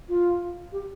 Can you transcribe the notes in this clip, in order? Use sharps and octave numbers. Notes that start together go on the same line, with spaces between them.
F4
G4